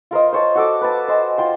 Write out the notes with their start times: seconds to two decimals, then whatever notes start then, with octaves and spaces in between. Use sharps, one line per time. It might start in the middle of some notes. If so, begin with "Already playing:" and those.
0.11 F4 A#4 C5 D#5
0.33 C5 C#5 A5
0.55 F#4 A4 D6
0.81 B4 A5
1.08 C5 D#5 G#5 A5
1.38 F4 G5 C6